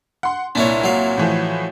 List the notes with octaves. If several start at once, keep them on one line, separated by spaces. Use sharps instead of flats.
F#5 C6
C2 A#2 D4 E4 C#5
F#3 F5
A2 E3 F3